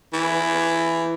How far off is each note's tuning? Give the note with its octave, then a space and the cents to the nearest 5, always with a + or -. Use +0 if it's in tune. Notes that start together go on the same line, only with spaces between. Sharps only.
E3 +10